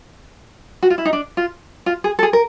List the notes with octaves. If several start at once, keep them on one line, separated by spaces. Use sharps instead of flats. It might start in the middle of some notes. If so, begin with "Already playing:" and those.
F#4
F4
E4
D#4
D4
F4
F4
G#4
A4
G#4
A#4